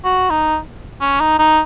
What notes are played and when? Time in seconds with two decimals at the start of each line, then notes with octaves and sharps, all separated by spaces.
0.04 F#4
0.30 D#4
1.01 C#4
1.20 D#4
1.39 D#4